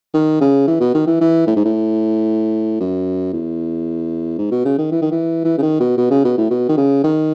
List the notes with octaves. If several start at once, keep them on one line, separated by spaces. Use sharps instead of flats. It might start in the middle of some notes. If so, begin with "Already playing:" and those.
D#3
C#3
E3
B2
D#3
E3
E3
A2
G#2
A2
F#2
E2
G#2
B2
C#3
D#3
E3
D#3
E3
E3
C#3
D#3
B2
B2
C#3
B2
A2
B2
D#3
C#3
D#3